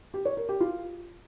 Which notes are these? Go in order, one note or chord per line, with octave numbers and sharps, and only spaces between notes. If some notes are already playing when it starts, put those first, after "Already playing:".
G4
C#5
A#4
G4
F4